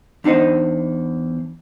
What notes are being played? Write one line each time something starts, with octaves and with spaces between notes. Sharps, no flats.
E2 D4 D#4 C5 D#5